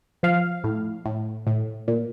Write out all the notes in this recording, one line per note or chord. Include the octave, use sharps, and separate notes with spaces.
F3 F5
A2
A2
A2
A#2